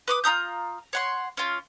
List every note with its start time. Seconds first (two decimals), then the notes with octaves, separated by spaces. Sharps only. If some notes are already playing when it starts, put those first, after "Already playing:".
0.08 B4 D6 D#6
0.24 F4 A#5 D#6 G6
0.93 C#5 F#5 C6
1.37 C#4 F4